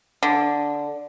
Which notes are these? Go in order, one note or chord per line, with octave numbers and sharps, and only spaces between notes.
D3